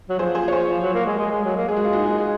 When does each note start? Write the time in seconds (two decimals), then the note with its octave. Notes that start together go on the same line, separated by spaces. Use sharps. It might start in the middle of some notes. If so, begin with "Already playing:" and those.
0.09 F#3
0.19 F3 G#4 C5
0.35 G#4 C5
0.48 C#5
0.52 G#4 C5
0.68 F3
0.81 F#3
0.94 A#3
1.06 G#3
1.18 G#3
1.31 G#3
1.45 F#3
1.57 A#3
1.68 G#3 G#4
1.77 F#4
1.85 F4
1.93 D#4 F#4
2.19 G#3